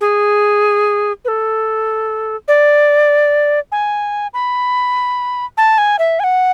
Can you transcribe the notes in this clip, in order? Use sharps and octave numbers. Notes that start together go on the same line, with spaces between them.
G#4
B4
A4
D5
G#5
B5
A5
G#5
E5
G#5
F#5